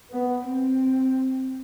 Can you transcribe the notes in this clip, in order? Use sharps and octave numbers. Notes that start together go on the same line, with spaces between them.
B3
C4